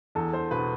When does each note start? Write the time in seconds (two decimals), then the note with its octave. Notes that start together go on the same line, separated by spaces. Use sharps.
0.15 E2 A4
0.33 C5
0.51 B2 B4